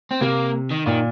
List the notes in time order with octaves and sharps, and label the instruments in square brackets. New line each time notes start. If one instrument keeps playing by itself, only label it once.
[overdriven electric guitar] C4
[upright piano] C3 [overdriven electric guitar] A#3
[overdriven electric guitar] D#3
[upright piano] A#2 [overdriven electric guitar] D#3